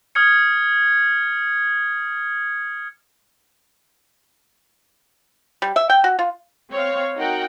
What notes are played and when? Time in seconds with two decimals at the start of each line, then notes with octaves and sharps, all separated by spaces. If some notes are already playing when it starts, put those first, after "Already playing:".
0.15 D#6 F6 G#6 C#7
5.62 G3
5.76 E5
5.90 G5
6.04 F#4
6.19 F4
6.71 C4 C#5 F5
7.15 D#4 F#4 A#4 F#5 G5